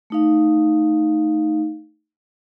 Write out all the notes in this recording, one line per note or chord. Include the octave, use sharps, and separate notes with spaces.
A3 D#4 F5